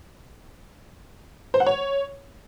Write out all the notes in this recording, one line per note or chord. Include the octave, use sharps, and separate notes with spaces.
C5
F#5
C#5